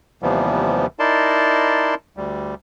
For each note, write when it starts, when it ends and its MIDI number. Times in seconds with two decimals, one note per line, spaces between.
0.22 0.86 39
0.22 0.86 48
0.22 0.86 52
0.22 0.86 53
0.22 0.86 55
0.22 0.86 59
0.99 1.95 63
0.99 1.95 64
0.99 1.95 70
0.99 1.95 74
0.99 1.95 81
0.99 1.95 84
2.17 2.54 38
2.17 2.54 55